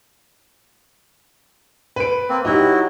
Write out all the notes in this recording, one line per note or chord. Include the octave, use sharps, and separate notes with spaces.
B4 D7
A#3 C4
F#3 D#4 E4 F#4 G4